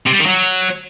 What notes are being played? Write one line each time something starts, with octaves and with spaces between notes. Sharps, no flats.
C3
G3
D#3
F#3